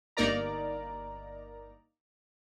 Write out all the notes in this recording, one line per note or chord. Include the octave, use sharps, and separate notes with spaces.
G1 A#3 D#4 A#4 D5 A#5